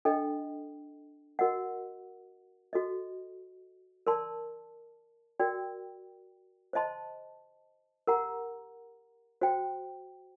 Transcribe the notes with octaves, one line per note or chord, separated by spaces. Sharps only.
D4 A4 D#5 G5
F#4 A#4 D#5 F#5
F#4 A4 D#5
A#4 D5 A5 C6
F#4 A#4 D5 G5
C5 D#5 A5 C6
G4 A#4 F#5 A#5
F#4 C5 G5